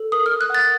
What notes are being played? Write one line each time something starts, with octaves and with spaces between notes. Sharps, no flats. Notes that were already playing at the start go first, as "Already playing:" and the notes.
Already playing: A4
A#4 D#6
F6
A#4
F#6
F#5 A6